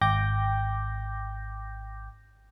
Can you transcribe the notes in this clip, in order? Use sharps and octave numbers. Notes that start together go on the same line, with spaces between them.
G#1 G5 D6 G6 A#6